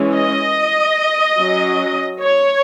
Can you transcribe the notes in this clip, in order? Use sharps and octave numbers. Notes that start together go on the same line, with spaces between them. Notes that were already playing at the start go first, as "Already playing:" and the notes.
Already playing: E3 G#3 C#4
D#5
F#3 C#4
C#5